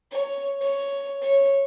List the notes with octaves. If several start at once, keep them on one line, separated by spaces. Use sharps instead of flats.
C#5
C#5
C#5